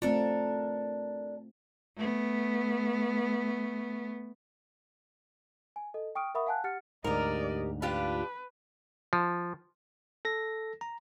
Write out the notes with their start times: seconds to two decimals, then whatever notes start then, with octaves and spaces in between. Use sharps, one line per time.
0.02 A3 C4 D4 F4 A4 A#4
1.97 A3 B3
5.76 G#5
5.94 A4 D#5
6.15 G5 C#6 D#6 F6 D7
6.35 A#4 E5 F#5 B5 C#6 D#6
6.47 F5 F#5 G#5 A5 F#6
6.64 G4 F#5 F6 A6 C#7
7.04 D2 G#2 G4 A#4 D5 D#5
7.82 D4 F4 G4 B4
9.13 F3
10.25 A4 A#6
10.81 A#5